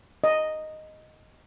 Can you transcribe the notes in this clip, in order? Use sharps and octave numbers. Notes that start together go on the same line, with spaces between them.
D#5